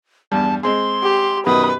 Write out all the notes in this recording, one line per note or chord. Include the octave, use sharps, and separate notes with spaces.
E2 G2 G3 A5
G#3 C4 G#4 C6
G4
F#2 B2 D#3 B4 D#6